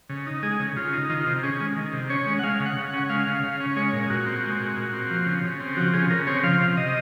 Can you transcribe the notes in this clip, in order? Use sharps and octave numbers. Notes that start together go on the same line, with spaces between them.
C#3
D#4
G#3 G#4
C#3
C#3 F4
D#4
D#3 F4
C3
C#4 G#4
G#3
D#3
C3
C#4 C#5
G#3
F#5
G#3 F5
C#3
F#5
C#3
F#5
C#4
G#3 F5
C#3
C#3
C#4
G#3 C#5
A#2
A#2 F#4
C4
G#3
A#2
A#2
C4
F3
C#3
C#3
C4
F3 F#4
C#3 G#4
C#3 A#4
C4 C#5
F3 F5
C3
C3 D#5